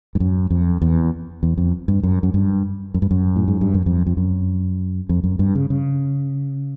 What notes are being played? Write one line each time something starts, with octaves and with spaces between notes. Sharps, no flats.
G2
F#2
F2
E2
E2
F2
G2
F#2
F#2
G2
F#2
G2
F#2
A2
G#2
G2
F#2
F2
F2
F#2
F2
F#2
G2
C#3
C#3